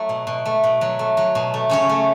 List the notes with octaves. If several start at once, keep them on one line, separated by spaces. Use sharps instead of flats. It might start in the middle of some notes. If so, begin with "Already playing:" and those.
Already playing: F#3 A3 E4 E5
B2
B2
A3
B2
F#3
A3
F#3
B2
A3
C#3 C#4 C#5
A3